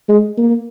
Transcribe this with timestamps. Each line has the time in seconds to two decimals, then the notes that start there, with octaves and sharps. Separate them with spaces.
0.09 G#3
0.38 A#3